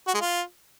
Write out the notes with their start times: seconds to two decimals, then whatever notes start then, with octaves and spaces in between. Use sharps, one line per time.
0.08 F#4
0.14 G#3
0.21 F4